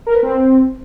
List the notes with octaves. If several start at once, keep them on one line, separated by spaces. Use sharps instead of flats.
A#4
B4
C4